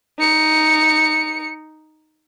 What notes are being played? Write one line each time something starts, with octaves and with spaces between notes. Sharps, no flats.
D#4 C#7